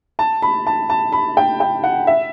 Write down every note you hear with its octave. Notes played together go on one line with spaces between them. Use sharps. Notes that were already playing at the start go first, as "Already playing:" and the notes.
A5
B5
A5
A5
B5
G5
G5
F#5
E5